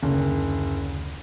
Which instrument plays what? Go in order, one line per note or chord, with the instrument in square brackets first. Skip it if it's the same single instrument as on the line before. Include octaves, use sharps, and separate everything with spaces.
[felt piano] F#1 [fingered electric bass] D2 D3